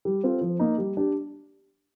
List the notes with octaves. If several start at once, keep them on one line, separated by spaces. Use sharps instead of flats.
G3
C4 F4 A4
F3
A#3 D#4
G3
D4 G4